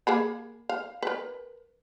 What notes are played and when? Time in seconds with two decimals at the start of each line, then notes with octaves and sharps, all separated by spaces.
0.07 A#3 G#4 B5
0.69 F5
1.02 A#4 B4